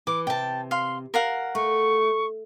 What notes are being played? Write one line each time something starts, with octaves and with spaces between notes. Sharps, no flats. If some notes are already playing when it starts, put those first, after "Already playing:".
E3 D6
C3 G5 A5
F5 C6
A#4 F5 F#5
A3 C#6